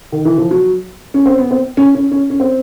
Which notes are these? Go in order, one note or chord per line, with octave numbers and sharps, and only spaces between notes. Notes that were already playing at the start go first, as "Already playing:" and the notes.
D#3
E3
F3
F#3
C#4
C4
B3
C4
C#4
C#4
C#4
C#4
C4